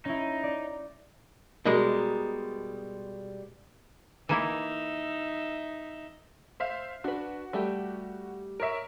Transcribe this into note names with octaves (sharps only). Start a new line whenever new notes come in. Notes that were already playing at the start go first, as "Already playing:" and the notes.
C#4 D#4 E4
D5
B2 G3 G#3 A#4
E3 A#3 D#4 E4 E5
C5 E5 F5
D4 F#4 B4
G3 A3 G4
A#4 C#5 E5